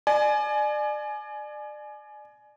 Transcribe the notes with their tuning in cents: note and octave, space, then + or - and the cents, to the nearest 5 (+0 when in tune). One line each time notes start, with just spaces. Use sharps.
D5 +30 G#5 +25